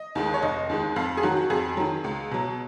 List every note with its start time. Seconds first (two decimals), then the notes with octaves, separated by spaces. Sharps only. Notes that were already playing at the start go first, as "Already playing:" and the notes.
Already playing: D#5
0.15 D#2 D#3 G#3
0.34 C#5
0.42 F1 D#5
0.69 D#2 D#3 G#3
0.96 F2 F5
1.17 G#4
1.23 D#3 F#3 F#4
1.37 F#4
1.50 F2 G#4
1.77 D#3 F#3
2.04 C#2
2.31 B2 F#3